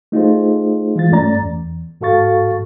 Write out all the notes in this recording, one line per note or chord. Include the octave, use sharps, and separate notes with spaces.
A3 D#4 F4 G#4 C5
E3 G#3 F4 A6
G2 A3 C#4 D5 A#5 A6
E2
G#2 F#4 A4 F5 C#6 A6